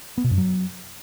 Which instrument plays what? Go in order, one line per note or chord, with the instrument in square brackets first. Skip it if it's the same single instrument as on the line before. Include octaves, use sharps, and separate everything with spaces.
[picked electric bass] B3
B2
F#2
F#3